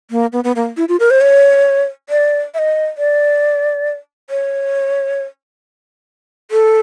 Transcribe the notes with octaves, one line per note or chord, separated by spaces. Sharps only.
A#3
B3
B3
A#3
E4
F4
A#4
C5
C#5
D5
E5
D#5
D5
C#5
A4